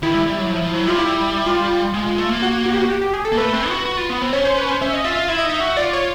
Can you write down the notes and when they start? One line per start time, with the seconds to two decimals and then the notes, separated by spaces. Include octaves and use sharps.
0.02 D#3 E4
0.14 G3
0.26 G3
0.39 F#3
0.51 F3
0.62 F3
0.74 F#3
0.86 G3 F4
0.98 E4
1.46 F4
1.94 G#3
2.06 G#3
2.18 A3
2.29 A#3
2.42 F#4
2.66 F#4
2.74 G4
2.81 F#4
2.90 G4
3.01 G4
3.14 G#4
3.25 A4
3.32 A#3
3.37 A3 B4
3.53 C4
3.69 F#4
3.86 F#4
3.97 F4
4.09 B3
4.22 C4
4.33 C#4 C#5
4.45 C5
4.57 B4
4.68 C5
4.82 C#4 E5
4.93 D#5
5.04 F4 E5
5.17 F5
5.28 E4 E5
5.38 D#5
5.44 D#4
5.50 E5
5.60 F#4
5.77 F4 D5
5.93 C#5